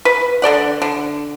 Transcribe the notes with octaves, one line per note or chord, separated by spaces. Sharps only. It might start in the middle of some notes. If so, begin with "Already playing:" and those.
B4
D3 A4 D5 F#5
D3